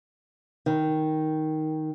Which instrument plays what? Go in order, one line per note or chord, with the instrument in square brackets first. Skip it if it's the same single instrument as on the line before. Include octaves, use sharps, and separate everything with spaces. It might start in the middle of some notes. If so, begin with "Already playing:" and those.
[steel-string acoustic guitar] D#3